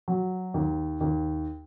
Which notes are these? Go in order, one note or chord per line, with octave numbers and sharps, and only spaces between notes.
F#3
D#2
D#2